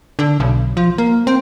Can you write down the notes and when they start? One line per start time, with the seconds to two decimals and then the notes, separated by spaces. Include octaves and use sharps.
0.19 D3
0.40 B1
0.77 F3
0.98 A#3
1.27 C4